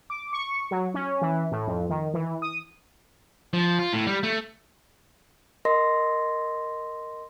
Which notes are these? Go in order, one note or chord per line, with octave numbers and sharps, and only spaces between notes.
D6
C#6
F#3
C#4
E3
A2
F2
D#3
E3
D#6
F3
F4
A2
G3
A3
A#4 D#5 C6 A#6